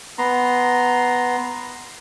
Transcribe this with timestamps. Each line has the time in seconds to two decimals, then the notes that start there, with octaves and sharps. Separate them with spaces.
0.18 B3 A#5 C6